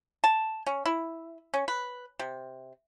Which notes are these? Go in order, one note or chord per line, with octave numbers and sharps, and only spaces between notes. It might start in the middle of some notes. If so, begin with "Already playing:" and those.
A5
C#4
E4
C#4
B4
C3